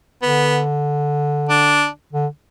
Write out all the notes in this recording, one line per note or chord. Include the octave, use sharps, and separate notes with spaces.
D3 B3
D4
D3